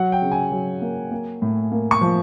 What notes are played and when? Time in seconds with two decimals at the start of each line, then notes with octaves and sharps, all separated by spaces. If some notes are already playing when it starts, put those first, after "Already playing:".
Already playing: F#3 F#5
0.12 G5
0.22 C#3
0.31 G#5
0.52 F#3
0.82 A#3
1.11 A#3
1.42 A2
1.72 A#3
1.91 C#6
2.01 F3